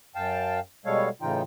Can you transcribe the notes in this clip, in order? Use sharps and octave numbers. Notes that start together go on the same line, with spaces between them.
F#2 F5 G5 A5
B2 G3 G#3 A4 C#5 F5
A2 C#3 E3 D#4 F4 G5